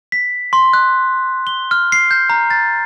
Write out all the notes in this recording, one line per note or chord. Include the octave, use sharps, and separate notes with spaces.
B6
C6
F#6
G7
F6
C7
G6
A#5
A6